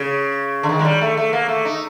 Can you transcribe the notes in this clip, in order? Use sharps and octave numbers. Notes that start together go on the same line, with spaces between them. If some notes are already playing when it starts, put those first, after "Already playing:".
Already playing: C#3
D3
D#3
G#3
G3
A3
A3
A#3
A3
D#4